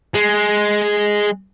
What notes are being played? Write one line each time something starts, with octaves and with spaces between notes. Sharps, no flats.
G#3